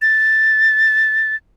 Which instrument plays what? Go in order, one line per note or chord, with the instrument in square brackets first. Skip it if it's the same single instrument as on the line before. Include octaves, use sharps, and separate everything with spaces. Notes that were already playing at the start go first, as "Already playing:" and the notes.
[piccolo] A6